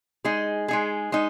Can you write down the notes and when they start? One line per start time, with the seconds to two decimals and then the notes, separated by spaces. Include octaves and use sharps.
0.25 G#3 D#4 G#4
0.68 G#3 D#4 G#4
1.12 G#3 D#4